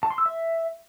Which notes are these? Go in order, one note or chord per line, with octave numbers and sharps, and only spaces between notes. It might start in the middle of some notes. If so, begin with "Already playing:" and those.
A5
C6
E6
E5